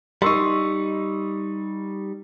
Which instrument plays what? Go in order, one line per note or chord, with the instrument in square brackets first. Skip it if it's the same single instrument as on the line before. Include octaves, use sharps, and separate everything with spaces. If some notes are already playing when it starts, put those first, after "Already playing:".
[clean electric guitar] G3 D#4 [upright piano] C6 C#6 E6